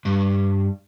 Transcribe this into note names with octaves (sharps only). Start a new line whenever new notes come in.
G2